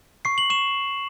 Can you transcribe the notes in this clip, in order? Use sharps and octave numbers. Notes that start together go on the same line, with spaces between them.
C#6 C7
F#7
C#6 E7